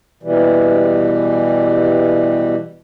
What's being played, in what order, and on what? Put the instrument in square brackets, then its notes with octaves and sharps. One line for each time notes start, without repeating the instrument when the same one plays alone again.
[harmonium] B2 E3 G3